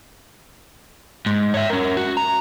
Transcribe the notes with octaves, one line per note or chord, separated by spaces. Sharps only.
G#2
C#5 E5
C#4 A#4
F#4
A#5